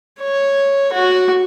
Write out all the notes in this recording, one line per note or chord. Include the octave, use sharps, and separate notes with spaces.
C#5
F#4